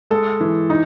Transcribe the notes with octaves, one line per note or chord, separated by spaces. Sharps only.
G#3 A4
E3
D#4